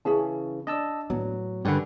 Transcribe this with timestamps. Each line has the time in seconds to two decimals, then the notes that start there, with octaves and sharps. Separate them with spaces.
0.05 C#3 E3 C#4 G#4 A5
0.67 D4 D5 D#5 A5 E6
1.10 A2 F#3 B3
1.65 G2 D3 C#4 G4 A#4 B4 D5 F#5